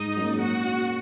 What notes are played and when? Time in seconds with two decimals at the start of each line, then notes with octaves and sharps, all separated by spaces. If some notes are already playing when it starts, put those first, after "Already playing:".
Already playing: G#2 D#4 D#5
0.17 F#3 A#3 C#4 G#4
0.40 A#2 F#4 F#5
0.64 A#3 C#4